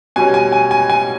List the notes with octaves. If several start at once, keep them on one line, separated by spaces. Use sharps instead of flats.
B2 G3 C#4 G#5
G#5
G#5
G#5
G#5